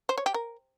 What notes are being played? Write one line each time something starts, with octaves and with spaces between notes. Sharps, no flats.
C5
C#5
G4
A#4